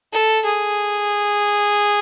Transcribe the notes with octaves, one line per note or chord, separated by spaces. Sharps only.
A4
G#4